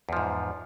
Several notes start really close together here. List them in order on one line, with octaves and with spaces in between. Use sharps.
E2 F3 G#2